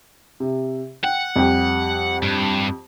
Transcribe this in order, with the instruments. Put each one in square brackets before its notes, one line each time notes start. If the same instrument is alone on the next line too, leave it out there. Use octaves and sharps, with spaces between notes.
[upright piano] C3
[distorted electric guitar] F#5 [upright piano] G5
[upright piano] F2 G3 G4
[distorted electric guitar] G2